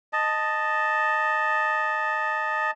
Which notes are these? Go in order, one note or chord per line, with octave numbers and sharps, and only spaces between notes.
D#5 A5